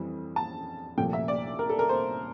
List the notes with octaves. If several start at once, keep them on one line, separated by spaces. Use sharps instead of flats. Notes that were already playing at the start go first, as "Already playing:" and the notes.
Already playing: F2 E3 G3 C4
A5
C2 A#2 F3 A3 G5
E5
D5
A#4
A4
A#4
C5